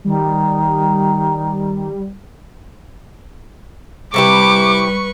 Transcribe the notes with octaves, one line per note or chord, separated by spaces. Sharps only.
D#3 G3
C3 G3 E4 G4 B4 C#6 D6